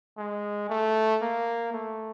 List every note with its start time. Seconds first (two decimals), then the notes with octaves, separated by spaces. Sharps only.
0.17 G#3
0.69 A3
1.22 A#3
1.73 A3